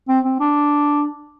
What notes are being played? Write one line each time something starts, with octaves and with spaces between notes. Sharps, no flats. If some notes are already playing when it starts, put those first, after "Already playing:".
C4
C4
D4